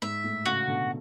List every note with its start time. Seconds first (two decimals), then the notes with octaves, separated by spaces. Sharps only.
0.02 G#2 E5
0.24 A2
0.46 A2 C#3 F#4
0.68 B2 D3